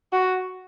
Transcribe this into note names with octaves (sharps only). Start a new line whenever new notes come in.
F#4